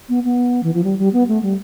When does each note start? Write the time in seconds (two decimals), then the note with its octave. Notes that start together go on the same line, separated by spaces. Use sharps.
0.09 B3
0.24 B3
0.63 E3
0.74 F3
0.84 G3
0.99 G3
1.13 B3
1.28 A3
1.43 G3